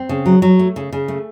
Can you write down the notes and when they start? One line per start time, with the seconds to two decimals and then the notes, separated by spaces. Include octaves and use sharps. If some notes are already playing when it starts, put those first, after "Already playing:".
Already playing: C4
0.09 C#3
0.26 F#3
0.42 F#3
0.59 A3
0.76 C#3
0.92 C#3
1.08 A3